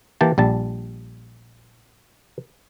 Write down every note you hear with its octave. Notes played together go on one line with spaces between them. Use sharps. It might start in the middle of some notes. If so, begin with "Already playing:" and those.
E3 A#3 G4 A5
A#1 G3 A5